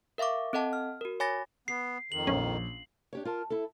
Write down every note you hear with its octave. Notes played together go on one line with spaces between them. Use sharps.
A#4 E5 F5 C#6 D6
C4 A4 D#5 F#5 A5
F6
F#4 A#4
C#5 G#5 B5 D6 A6 A#6
B3 C7
F2 D#3 F#7
A#1 C#4
D4 G4 C#5
F4 A#4 A5
E4 A4